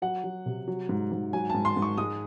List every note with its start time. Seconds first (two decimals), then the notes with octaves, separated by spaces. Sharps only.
0.02 F#3 F#5
0.24 F#3
0.46 C3
0.68 F#3
0.89 G#2
1.12 G#2
1.33 F#3 G#5
1.50 G#2 A5
1.65 C6
1.77 G#2
1.82 C#6
1.98 G#3 D#6